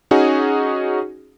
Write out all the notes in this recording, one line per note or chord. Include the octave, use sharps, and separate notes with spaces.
C#4 D#4 F#4 G#4